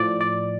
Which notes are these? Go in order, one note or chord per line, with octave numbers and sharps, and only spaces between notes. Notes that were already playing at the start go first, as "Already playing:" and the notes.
Already playing: A2 F3 D5
D5